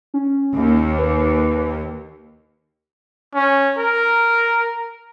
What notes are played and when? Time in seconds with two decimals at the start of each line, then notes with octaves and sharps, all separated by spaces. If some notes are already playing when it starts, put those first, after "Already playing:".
0.14 C#4
0.56 D#2
0.98 B4
3.34 C#4
3.77 A#4